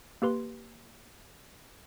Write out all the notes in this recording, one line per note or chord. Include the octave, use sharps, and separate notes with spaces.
A#3 G4 B4 C6